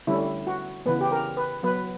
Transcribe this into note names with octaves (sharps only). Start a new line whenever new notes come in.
D3 G3 C#4 E4
F#4
C#3 E3 B3 B4
G4
A#4
B4
F#3 B3 B4